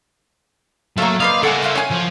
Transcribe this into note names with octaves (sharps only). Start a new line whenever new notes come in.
F#3 A3 A#3 E5 F5 C#6
A#3 B4 C5 D5 D#5 F5
E4 A4 A#4 F#5 G#5 C#6
E5 F5 C6
C#5 G#5 C#6
F3